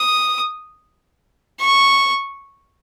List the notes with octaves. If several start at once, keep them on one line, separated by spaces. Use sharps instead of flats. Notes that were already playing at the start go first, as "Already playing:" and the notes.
Already playing: D#6
C#6